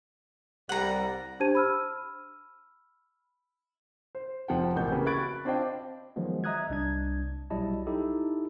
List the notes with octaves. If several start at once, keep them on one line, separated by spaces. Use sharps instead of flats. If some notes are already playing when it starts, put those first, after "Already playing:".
C2 G3 F#5 A#5
D4 G4 C5 A5 G#6 D#7
B5 E6 F6
C5
F1 F2 F3 F#5 G5
A1 B2 G4 A#4 G6
C#3 A#3 F#4 G4 B4
B5 C#6 F#6 G#6 A6 D7
C4 D4 F4 C5 D#5 G5
D#3 F3 F#3 G#3 B3
D#5 E5 A#5 D#6 F#6 G#6
C2 D4 G#6
B1 F#3 G3 E4 D#5 A5
D#4 E4 G4 A4